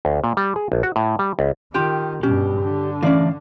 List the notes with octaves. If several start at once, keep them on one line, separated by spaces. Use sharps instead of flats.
D2
A#2
G3
G#4
A#1
F#4
A2
G3
C#2
D#3 F4 G4 G5
G2 B2 C#4 G4
D3
A2 E3 C#4 D5 F5